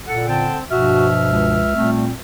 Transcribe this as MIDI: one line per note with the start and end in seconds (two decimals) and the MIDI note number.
0.08 0.48 46
0.08 0.28 69
0.08 0.28 78
0.28 0.58 50
0.28 0.64 60
0.28 0.58 79
0.28 0.58 81
0.71 1.64 43
0.71 1.64 47
0.71 1.64 53
0.71 1.08 66
0.71 1.90 76
0.71 1.90 89
1.26 1.73 37
1.75 2.11 46
1.75 2.11 55
1.75 2.05 57
1.75 2.11 60